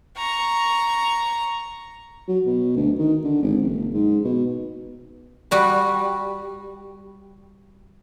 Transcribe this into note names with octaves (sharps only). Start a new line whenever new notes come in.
A#5 C#6
F#3
B2
D2
D#3
D3
G#1
F#1
G#2
B2
G3 F#4 B4